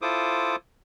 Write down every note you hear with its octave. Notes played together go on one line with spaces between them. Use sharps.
E4 F4 A4 C5 D6 D#6